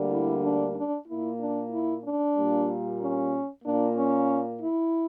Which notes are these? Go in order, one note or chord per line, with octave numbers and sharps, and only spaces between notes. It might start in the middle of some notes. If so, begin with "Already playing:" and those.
Already playing: D2 D3 G3 A#3
E4
D4
D4
A#2 A#3 E4
D4
E4
D4
A#2 G3 A#3
C#4
A#2 A#3 D4
C#4
E4